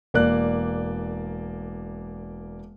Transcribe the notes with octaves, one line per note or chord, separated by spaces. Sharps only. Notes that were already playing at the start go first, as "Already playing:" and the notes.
E1 A#3 D5 F#6